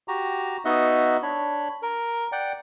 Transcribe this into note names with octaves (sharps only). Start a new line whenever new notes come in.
F#4 G4 A#5
B3 D#4 F#4 D#5 E5 F#5
D4 C#5 B5
A#4
D5 F#5 G5